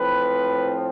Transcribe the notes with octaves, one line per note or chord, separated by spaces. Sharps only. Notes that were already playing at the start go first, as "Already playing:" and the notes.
Already playing: A2 F3 C4 B4